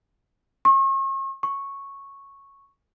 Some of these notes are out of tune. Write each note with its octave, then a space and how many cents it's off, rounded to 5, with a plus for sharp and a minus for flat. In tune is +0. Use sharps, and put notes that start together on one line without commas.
C#6 -40
C#6 -5